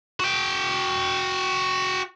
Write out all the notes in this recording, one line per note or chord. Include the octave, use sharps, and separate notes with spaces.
F#4 G5